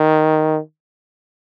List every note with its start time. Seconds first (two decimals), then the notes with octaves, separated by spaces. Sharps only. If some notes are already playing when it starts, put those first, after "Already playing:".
Already playing: D#3